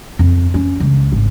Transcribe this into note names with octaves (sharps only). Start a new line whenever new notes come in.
F2
C#4
C#2
G#1